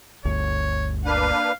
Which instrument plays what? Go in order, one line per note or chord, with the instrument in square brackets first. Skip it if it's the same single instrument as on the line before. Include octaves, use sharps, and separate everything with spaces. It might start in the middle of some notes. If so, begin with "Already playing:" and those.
[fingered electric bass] G1 D2 [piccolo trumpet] C#5
[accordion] A#3 D4 B4 [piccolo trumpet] F5